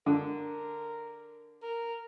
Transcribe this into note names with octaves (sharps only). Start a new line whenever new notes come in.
D3 A#4
A#4